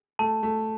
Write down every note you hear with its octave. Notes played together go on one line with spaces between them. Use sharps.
A3 A5
A3